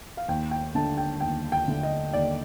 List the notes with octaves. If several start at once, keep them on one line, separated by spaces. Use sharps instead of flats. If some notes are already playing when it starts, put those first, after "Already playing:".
F5
D#2 G5
G5
D3 A3 D4 A5
G5
D#2 G5
G5
D3 A3 D4
D#5
D#2 D5